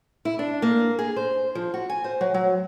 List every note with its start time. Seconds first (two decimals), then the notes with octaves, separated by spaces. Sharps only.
0.25 E4
0.39 D4
0.62 A#3
0.99 G#4
1.16 C5
1.55 F3
1.74 F#4
1.89 G#5
2.04 C5
2.21 F#3
2.34 F#3